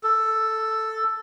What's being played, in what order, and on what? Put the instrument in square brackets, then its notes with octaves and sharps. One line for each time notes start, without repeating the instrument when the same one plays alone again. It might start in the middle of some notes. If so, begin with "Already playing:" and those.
[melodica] A4